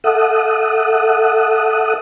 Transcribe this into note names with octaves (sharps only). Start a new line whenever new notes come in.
A4 E5 F#5 D#6